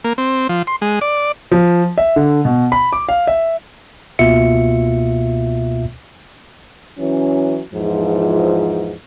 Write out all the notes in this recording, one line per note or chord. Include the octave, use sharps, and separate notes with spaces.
A#3
C4
F3
C6
G#3
D5
F3
E5
D3
B2
B5
D6
F5
E5
C#2 B2 A#3 F4 E5 C#7
E3 F#3 C#4
E2 G#2 F3